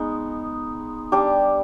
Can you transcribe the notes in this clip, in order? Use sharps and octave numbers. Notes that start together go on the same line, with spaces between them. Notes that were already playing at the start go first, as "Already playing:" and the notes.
Already playing: G#3 B3 D#4
G3 D4 G4